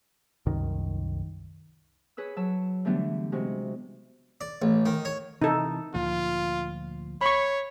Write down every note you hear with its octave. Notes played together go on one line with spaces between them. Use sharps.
C2 F#2 D#3
G#4 B4 C#5 E6
F#3 C#5 A5 E6
D3 E3 G3 A3 B3 D4
C3 G#3 F#4
D5
A1
D#3
C#5
C3 E3 D#4 A4
D2 A#2 F3 F4
C#5 B5 C#6